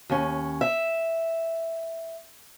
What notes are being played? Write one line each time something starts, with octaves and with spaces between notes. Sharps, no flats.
D#2 C#4
E5